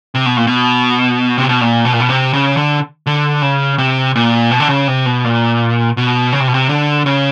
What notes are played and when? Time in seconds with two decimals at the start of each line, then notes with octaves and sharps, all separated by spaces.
0.15 C3
0.26 B2
0.37 A#2
0.47 B2
1.38 C3
1.49 B2
1.61 A#2
1.85 B2
1.93 A#2
2.00 B2
2.09 C3
2.33 C#3
2.57 D3
3.06 D3
3.42 C#3
3.78 C3
4.15 A#2
4.51 B2
4.60 D3
4.69 C#3
4.88 C3
5.06 B2
5.24 A#2
5.97 B2
6.33 C#3
6.40 C3
6.48 B2
6.54 C3
6.69 D3
7.06 C#3